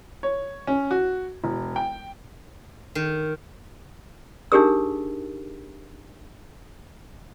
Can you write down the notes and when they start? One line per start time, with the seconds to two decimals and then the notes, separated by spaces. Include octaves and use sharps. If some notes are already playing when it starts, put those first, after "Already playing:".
0.23 C#5
0.67 C#4
0.91 F#4
1.44 E1
1.76 G5
2.95 D#3
4.52 D4 D#4 G4 G#4 A#4 E6